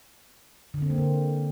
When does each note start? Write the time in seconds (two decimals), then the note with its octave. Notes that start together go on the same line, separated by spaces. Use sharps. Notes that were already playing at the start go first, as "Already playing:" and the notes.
0.74 D3
0.82 C4
0.90 A#3
0.98 D3